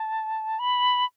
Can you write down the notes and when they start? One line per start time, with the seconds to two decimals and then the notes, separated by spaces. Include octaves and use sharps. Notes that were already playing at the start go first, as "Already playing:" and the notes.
Already playing: A5
0.59 B5